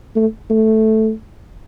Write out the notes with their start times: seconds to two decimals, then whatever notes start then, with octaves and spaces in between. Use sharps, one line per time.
0.16 A3
0.50 A3